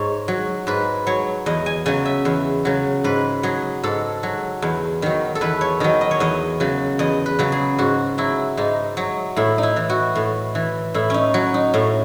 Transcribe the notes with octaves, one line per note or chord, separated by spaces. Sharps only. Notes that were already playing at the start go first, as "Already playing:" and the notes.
Already playing: G#2 C#5
F#3
G#2 B4
F#3 C#5
E2 D#5
G#5
C#3 F#3 G#5
E5
E2
C#3 F#3
G#2 B4
F#3 G#4
G#2 A4
F#3
E2
D#3 F#3
A4
E2 B4
C#5
D#3 F#3 D#5
D#5
C#5
E2 D#5
C#3 F#3
E2 D#5
B4
C#3 F#3
G#4
G#2 F#4
F#3 E4
G#2 D#4
F#3
A2 E4
D#4 E4
E3
F#4
A2
E3
A2 E4
C#4 D#4
F#3
D#4
A2 C#4